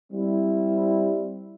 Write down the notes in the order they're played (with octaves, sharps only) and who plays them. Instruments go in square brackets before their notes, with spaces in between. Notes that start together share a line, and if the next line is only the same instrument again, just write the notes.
[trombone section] G3 C4 E4